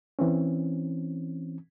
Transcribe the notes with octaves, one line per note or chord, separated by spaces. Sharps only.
E3 C4 C#4